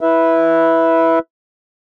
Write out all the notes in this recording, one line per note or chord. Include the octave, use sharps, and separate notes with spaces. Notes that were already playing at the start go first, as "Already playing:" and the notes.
E4 B4 E5